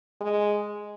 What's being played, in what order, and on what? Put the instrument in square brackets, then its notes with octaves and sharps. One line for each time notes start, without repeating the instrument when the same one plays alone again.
[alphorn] G#3